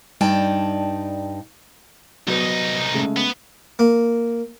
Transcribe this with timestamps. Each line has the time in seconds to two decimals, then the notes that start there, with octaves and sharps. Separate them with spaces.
0.21 G2 D#4 D5 G5 A5
2.28 C2 F#3 B3 D#4
2.94 C#3 G#3 A3
3.17 B3
3.79 A#3